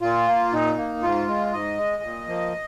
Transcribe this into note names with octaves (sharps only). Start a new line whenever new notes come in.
A#2 F4
A#3
A#2 D#4
A#3
G#2 F4
G#3
G#2 D#5
G#3
A#2
F3 A#3